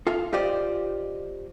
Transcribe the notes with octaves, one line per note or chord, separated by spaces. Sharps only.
F4 A4 E5 F5
F4 G4 C5 D5 D#5